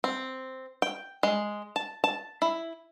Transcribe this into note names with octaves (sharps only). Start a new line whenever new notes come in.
C4
G5
G#3
A5
A5
E4